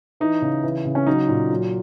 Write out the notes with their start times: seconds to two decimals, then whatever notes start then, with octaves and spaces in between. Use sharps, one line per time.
0.20 E3 D#4
0.42 C#3
0.64 E3
0.85 C#3
0.95 C#4
1.07 F#3 D#4
1.29 A#2
1.51 F#3